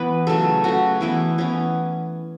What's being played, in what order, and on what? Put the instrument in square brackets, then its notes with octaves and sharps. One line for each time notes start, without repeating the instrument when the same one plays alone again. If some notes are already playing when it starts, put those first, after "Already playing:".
Already playing: [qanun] E3 B3 B4
C#3 F#3 A3 A4
C#3 A3 F#4
E3 B3 E4
E3 B3 C#4